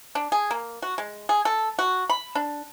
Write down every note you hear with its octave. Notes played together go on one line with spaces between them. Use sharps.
D4
G#4
A#3
F#4
G#3
G#4
A4
F#4
B5
D4